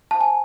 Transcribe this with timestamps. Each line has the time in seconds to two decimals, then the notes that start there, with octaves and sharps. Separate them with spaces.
0.11 C5 F5 A5
0.21 G#5